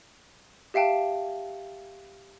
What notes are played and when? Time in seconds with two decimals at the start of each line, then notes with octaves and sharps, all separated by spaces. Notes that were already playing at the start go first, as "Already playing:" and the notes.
0.74 G4 E5 F5 G5 A5